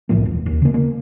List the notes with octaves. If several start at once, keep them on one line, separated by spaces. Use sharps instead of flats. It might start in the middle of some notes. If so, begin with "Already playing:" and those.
C2 A2 F3 A#3
E1
D#2
C#3 A#3
A#3